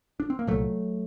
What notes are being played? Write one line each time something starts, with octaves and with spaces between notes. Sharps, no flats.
D4
C4
A#3
C2 A#2 F#3 A3